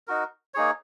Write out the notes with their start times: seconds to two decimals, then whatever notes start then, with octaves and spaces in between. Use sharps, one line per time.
0.08 D#4 F#4 A#4
0.54 A#3 D#4 G#4 C#5